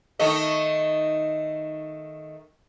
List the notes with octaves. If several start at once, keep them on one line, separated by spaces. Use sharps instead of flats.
D#3 A3 D#5